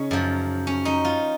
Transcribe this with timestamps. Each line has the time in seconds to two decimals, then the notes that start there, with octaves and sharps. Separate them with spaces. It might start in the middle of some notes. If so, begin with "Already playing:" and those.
Already playing: C#3 C#4 D#4
0.11 F#2 F3
0.67 C#4
0.85 D#4
1.05 F4